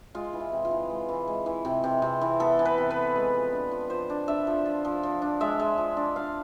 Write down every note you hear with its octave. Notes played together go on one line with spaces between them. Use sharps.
G#3 F4
E3
E4
C3
F4
E3
G#3
E3
G#3
E3
C3
C3
C3
E3
B3 A4
E3
B4
C3
B4
B3
G#3
F3
D4
F3
F3 C5
D4
D4 E5
F3
F3
F3
F3
D4
G#3 E5
G#3
F3
D4
D4 F5